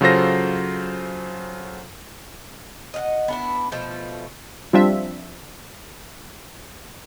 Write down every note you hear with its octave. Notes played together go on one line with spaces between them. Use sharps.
C#3 F#3 F4 A4 C5 A#6
D#5 F5 F#5
B3 D4 E4
B2 F3 A3
F3 G3 C4 D4 F4 E5